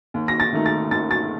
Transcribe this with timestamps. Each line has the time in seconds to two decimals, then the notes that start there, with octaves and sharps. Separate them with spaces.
0.14 D#2
0.28 A#6
0.40 A6
0.53 D#3 A3 D#4
0.66 A6
0.91 D#2 A6
1.11 A6